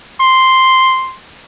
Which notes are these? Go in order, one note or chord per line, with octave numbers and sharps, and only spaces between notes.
C6